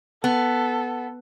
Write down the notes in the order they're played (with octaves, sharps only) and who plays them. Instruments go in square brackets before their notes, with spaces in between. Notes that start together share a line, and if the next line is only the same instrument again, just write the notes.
[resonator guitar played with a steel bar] B3 [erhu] A4